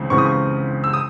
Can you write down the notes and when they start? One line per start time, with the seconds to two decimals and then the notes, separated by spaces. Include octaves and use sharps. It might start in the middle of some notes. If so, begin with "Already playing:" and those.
Already playing: C#2 C#3 E3 C4
0.10 C#2 C#3 E3 C4 C#6
0.18 D#6
0.26 C#6
0.84 E6
0.93 D#6